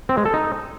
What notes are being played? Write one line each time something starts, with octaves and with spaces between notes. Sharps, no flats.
C4
G#3
A4
D#4